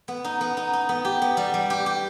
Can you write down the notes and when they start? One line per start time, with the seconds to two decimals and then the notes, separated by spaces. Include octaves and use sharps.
0.08 B3
0.24 D#4
0.41 B3
0.57 D#4
0.73 D#4
0.89 B3
1.05 G4
1.22 B3
1.37 G3
1.54 G3
1.70 G4
1.86 G4